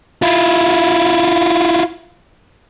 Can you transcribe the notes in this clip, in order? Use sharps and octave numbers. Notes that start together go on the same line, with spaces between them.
E4 F4